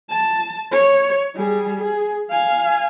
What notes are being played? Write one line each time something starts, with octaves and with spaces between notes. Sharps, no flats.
A5
C#5
G3 G#4
G#4
F5 G#5